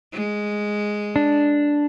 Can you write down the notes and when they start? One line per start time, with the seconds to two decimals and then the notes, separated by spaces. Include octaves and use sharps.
0.13 G#3
1.16 D4